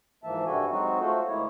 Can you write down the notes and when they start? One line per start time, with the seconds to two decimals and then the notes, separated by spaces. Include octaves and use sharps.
0.24 G#2 E3 F3 A#3 E5 A5
0.46 G2 C3 G3 F#4 A4 G#5
0.70 F#3 G#3 C4 D#4 F#4
1.00 A3 F4 F#4 A4 C5
1.27 D2 G#3 A#3 E4 C#5